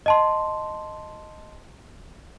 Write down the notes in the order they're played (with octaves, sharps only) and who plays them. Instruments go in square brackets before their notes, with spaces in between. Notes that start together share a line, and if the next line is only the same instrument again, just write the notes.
[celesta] D#5 A5 C6